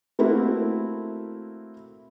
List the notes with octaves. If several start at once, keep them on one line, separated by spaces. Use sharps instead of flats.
A3 A#3 C4 E4 F#4